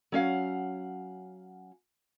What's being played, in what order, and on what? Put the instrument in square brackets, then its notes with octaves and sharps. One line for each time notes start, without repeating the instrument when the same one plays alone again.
[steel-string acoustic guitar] F#3 C#4 F5 F#5